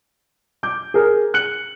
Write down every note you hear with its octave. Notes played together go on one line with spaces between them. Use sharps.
D6 G6
G#4 A#4
F#6 C#7 F#7